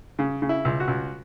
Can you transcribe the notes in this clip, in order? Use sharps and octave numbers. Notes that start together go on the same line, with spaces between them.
C#3
C#3
E4
C#2
F#4
C#2